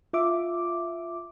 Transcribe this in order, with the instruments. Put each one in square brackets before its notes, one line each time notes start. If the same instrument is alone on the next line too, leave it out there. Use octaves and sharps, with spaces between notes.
[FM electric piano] F4 E5 D6